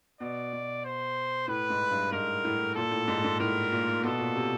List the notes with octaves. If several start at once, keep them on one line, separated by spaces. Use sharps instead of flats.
B2 D5
B2
C5
A2 B4
G#2
G2
G#2 A#4
A2
A#2 A4
A2
G#2
G#2
A2 A#4
A#2
B2 A4
A#2
C3